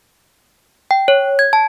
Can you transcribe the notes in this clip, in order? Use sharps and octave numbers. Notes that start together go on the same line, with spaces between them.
G5
C#5
G#6
A5